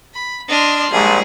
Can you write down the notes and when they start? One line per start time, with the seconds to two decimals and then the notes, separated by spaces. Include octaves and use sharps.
0.13 B5
0.49 D4 D#5 C6 F6
0.92 A#1 G3 G#3 D#4 G#4